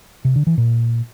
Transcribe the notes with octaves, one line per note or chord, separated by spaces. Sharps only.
C3
D3
E3
A#2